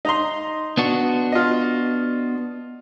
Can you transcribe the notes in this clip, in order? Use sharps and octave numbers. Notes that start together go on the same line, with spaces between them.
D#4 A#5 C6
B3 D4 F#4
F4 D#5